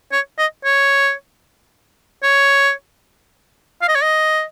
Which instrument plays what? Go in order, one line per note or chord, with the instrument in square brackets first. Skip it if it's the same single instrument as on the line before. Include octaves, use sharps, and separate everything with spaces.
[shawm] C#5
D#5
C#5
C#5
F5
D#5
C#5
D#5